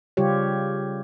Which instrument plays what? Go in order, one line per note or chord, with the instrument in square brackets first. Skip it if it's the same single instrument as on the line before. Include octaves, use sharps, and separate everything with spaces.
[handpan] C#3 G3 F4 G4 C#5